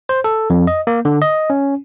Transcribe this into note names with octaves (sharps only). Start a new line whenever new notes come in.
C5
A4
F2
D#5
A#3
D3
D#5
C#4